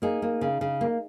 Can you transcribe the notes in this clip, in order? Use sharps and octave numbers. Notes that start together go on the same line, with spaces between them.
A#3 D#4 G#4
A#3
C#3
C#3
A#3